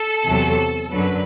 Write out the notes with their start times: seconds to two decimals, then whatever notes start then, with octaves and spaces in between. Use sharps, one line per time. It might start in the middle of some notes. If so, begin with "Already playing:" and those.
Already playing: A4
0.27 E2 C3 F#3
0.92 F#2 D3 F#3 B4